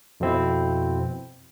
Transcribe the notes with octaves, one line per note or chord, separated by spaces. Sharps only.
F2 B2 C4 E4